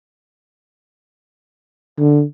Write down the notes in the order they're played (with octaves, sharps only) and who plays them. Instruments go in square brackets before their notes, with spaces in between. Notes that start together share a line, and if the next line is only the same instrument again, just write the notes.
[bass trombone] D3